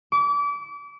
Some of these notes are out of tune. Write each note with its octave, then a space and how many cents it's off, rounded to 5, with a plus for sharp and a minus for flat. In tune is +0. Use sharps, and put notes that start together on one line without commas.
D6 -30